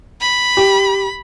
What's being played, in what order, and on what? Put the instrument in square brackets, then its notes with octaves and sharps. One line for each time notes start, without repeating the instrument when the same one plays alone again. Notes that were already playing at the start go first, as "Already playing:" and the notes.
[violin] B5
[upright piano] G4